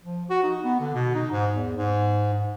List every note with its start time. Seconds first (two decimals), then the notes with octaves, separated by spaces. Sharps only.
0.04 F3
0.30 F#4
0.43 D#4
0.64 B3
0.80 D3
0.94 B2
1.15 D#4
1.32 G#2
1.54 E2
1.77 G#2
2.34 G#2